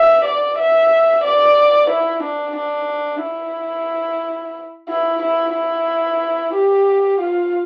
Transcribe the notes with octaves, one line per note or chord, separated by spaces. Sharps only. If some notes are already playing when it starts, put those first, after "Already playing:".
Already playing: E5
D5
E5
D5
E4
D4
D4
E4
E4
E4
E4
G4
F4